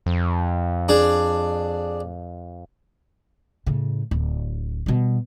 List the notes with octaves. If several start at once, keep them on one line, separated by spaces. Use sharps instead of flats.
F2
D4 G#4
A2 C#3
D1
B2 G3